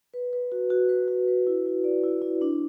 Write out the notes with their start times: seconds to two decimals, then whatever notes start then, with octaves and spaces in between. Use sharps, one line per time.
0.14 B4
0.33 B4
0.52 F#4
0.70 F#4
0.89 B4
1.08 F#4
1.27 B4
1.47 E4
1.66 E4
1.84 D5
2.04 E4
2.22 E4
2.41 D4